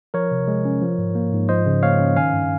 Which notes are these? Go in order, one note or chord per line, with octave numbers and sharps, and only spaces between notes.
F3 A#4 C#5
C3
G#3
C#4
F3
G#2
A#3
G#2
F3 C5 D#5
C#3
A#3 C#5 F5
C#4
D#3 F5 G#5
G2